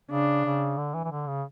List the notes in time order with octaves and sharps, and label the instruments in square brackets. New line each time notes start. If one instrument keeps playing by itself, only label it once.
[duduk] C#3 [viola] D4
[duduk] C#3
D3
E3
E3
D3
C#3